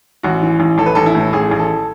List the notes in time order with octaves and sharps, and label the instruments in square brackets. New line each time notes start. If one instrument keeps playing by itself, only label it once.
[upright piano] A1 F#4
E3
A1
A1 A4
B4
A1 A4
E4
A2
A1 G#4
A1
A4